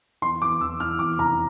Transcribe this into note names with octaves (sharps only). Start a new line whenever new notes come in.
E2 C6
E2 D6
E2 E6
E3 F6
E2 D6
F1 A#5